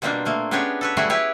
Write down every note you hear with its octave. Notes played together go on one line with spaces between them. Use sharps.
B2 G3 A#3 C4 D4 F4
A#2 A3 A#3
B3 C#4 D4 G4 G#4 C#5
A4 B4 C#5
F#3 G3 A3 E4 F#4 G#4
E4 G4 G#4 B4 C#5